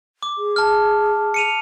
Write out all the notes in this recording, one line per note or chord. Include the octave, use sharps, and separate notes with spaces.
D6
G#4
A5 F6
C#7 D#7 F7